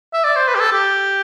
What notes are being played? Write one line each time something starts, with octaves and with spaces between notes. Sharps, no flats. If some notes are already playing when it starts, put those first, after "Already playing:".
E5
D5
C5
B4
G4
A4
G4